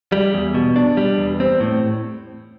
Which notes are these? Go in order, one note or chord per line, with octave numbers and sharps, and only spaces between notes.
G3
E2
B2
D4
G3
E2
C4
A2